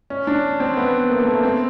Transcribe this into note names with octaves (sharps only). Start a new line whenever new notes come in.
C#4
D4
C4
B3
A#3
A3
A#3
C4